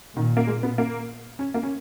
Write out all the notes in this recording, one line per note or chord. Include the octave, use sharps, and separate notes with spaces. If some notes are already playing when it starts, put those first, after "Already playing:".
A#2 D#3
A#3
G#3
B3
A#3
C#4
A#3
C#4